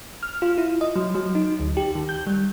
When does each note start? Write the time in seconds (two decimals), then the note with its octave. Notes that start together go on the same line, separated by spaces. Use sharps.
0.23 F6
0.42 F4
0.58 E4
0.81 D#5
0.96 F#3
1.15 F#3
1.35 D#4
1.60 D2
1.77 G4
1.95 D#3
2.09 G6
2.27 G3